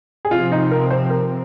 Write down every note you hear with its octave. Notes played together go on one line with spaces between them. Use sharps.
G#4
C3 F3 C4 F4
D#4
A#4
C5
A#4